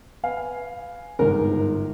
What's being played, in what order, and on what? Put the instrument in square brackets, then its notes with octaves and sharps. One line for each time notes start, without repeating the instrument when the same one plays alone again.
[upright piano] B4 F5 G#5
[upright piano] G1 G#2 [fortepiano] A#4